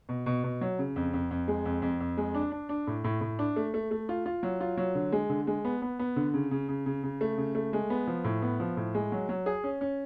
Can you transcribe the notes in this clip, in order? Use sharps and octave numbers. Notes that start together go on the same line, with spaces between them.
B2
B2
B2
F#3
C#3
F2
F2
F2
G#3
F2
F2
F2
G#3
D4
D4
D4
A2
A2
A2
D4
A3
A3
A3
F4
F4
F#3
F4
F#3
D3
G#3
D3
G#3
B3
B3
B3
D3
C#3
C#3
C#3
C#3
C#3
A3
C#3
A3
G#3
B3
F3
A2
B3
F3
A2
G#3
F#3
F#3
G#4
C#4
C#4